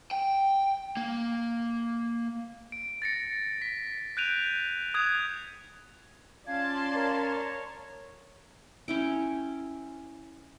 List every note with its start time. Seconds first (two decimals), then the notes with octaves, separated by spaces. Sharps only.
0.11 G5
0.97 A#3
2.72 D7
3.02 A6 A#6 C#7
3.62 B6
4.17 F#6 G6 D7 D#7 F7
4.94 D#6 F#6 G#6 F7
6.47 C#4 F4 D5 F5 A5 C6 G#6
6.95 A#4 C#5
8.88 C#4 E4 G5